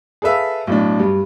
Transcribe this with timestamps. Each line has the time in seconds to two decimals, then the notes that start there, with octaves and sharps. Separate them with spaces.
0.22 G#4 A4 B4 E5 F5
0.67 B1 A2 D4
1.00 G2